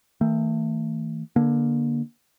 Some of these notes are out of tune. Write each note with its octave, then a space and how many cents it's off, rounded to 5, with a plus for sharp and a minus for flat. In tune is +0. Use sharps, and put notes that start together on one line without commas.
E3 -45 A3 +35
D3 +0 A#3 +25